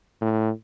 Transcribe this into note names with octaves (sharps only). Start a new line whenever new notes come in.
A2